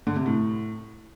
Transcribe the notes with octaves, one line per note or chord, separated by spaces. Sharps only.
D3
C3
A2